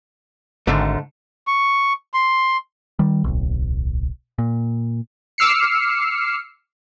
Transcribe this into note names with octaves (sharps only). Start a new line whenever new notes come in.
G#1 G#2 D3 A3
C#6
C6
D#3 G3
D1 B1
A#2
D6 E6 F6 C7 C#7